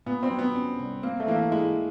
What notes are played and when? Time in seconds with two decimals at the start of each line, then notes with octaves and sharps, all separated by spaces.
0.06 A#2 B3
0.23 C4
0.31 F#3
0.39 B3
0.56 C#4
0.79 C2
1.03 A#3 C4
1.20 A3
1.28 E3 A#3
1.36 A3
1.52 G#3 E4